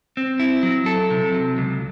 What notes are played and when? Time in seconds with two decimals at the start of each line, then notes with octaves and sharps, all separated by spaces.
0.17 C4
0.40 E4
0.63 F#3
0.86 A4
1.11 C3
1.34 F#3
1.58 C#2